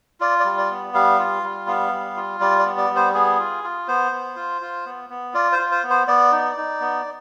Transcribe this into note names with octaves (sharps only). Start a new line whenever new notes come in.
F4 D5
G3 D5
D5
B3
G3 F5
F4
G3
B3 F5
G3
F4
G3 D5
D5
B3
D5
G3
C5
B3 G#4
F4
F4
B3 C5
B3
F4
F4
B3
B3
F4 D5
C5
F4
C5
B3
C5
B3 D5
D#4
D#4
B3